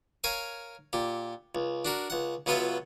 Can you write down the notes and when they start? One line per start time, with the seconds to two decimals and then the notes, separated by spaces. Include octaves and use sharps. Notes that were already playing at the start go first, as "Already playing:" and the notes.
0.24 A#4 C#5 F5 G#5
0.93 A#2 G4
1.55 C#2
1.85 D4 F#4 A#4
2.10 C#2 F#5
2.46 C#2 F#3 B3 F4 B4 E5